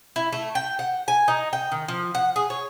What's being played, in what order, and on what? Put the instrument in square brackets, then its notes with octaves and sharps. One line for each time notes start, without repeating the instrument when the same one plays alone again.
[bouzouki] E4
A3
G5
F#5
G#5
D#4
G5
D#3
F3
F#5
G#4
C#5